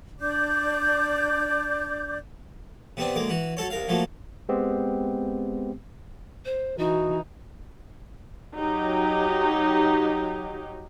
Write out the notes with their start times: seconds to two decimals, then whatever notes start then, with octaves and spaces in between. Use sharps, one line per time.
0.20 D4 D5 D6 G6
2.97 C3 B3 C4 D4
3.16 D2 G#3 A#3 D6
3.29 E3 F#4
3.57 F#3 A4 C#5
3.70 C2 A#4 F5
3.88 F3 F#3 A3 A#3
4.49 G#3 B3 C4 G4
6.45 C5
6.78 E3 D#4 F#4
8.55 F#3 D#4 G4